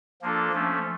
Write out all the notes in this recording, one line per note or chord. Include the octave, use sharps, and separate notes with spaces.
F3 A#3 D4 F4 A4
F3 A3 C#4